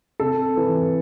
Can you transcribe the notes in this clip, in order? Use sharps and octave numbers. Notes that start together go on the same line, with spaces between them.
C3 A4
E3